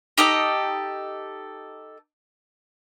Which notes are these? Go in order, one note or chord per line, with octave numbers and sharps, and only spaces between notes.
D#4 G4 A4 D#5